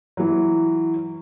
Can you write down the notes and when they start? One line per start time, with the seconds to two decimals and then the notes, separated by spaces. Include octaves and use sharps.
0.17 E3 F#3